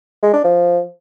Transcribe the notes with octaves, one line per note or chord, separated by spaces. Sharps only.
G#3
D4
F3